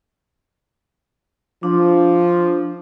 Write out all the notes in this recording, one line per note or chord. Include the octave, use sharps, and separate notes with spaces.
F3 D4